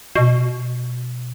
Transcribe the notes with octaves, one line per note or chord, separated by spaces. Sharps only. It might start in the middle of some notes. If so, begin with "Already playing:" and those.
B2